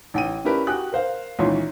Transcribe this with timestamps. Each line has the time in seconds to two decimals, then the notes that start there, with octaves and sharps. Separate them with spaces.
0.14 A1 G5 D#7
0.45 C#4 D4 E4 G4 A#4 B4
0.67 F#4 G4 G5 G#5 D#6 F#6
0.92 A#4 C5 F5
1.39 C#2 A#2 D#3 E3 C#5 C6